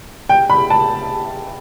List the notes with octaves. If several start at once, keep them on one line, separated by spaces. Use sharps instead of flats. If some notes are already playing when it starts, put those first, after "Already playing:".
G5
B5
A5